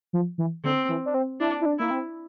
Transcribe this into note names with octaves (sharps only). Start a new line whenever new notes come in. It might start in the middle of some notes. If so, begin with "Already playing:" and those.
F3
E3
D3 C4
E3
D4
C4
D4 E4
E4
D4
A#3 E4
C4